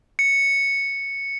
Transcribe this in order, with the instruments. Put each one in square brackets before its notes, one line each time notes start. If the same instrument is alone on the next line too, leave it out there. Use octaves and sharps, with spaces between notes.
[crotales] C#7